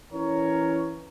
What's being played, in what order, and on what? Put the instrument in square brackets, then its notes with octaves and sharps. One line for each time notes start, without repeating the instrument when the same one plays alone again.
[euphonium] E3 [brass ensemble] C#4 A#4 C#5